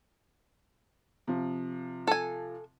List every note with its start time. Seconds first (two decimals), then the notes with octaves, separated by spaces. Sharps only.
1.27 C3 F3
2.07 A4 G#5